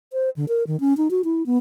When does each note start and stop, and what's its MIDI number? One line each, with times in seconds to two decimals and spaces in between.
0.13 0.30 72
0.36 0.45 50
0.48 0.64 70
0.67 0.79 51
0.80 0.97 61
0.97 1.11 63
1.11 1.22 66
1.24 1.45 64
1.46 1.58 59